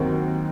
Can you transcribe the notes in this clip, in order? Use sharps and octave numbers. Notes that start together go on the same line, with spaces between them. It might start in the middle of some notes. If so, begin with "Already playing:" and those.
Already playing: D#2 D#3 F#3 C4 F#4